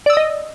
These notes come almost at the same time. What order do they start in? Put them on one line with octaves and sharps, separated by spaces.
D5 E6 D#6 D#5